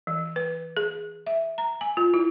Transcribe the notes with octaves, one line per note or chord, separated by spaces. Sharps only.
E3
B4
G#4
E5
A#5
G#5
F4
E4